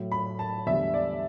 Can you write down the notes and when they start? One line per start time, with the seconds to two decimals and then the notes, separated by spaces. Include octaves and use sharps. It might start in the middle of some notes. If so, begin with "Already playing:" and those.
Already playing: A2 F#3
0.12 B5
0.39 A5
0.66 E2 D3 G3 E5
0.94 D5